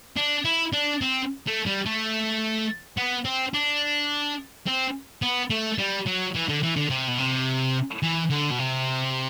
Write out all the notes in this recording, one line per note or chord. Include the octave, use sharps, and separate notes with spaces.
D4
E4
D4
C4
A3
G3
A3
B3
C4
D4
C4
B3
A3
G3
F#3
E3
D3
E3
D3
C3
B2
C3
E3
D3
B2
C3